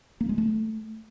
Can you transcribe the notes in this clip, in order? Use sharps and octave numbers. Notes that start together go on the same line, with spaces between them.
A#3
G#3
A3